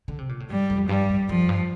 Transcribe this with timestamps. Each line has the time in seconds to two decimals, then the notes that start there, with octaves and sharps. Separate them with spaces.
0.08 D3
0.18 C3
0.29 A#2
0.40 A2
0.50 G2 G3
0.70 F2
0.89 G2 G3
1.10 G2
1.29 F2 F3
1.49 G2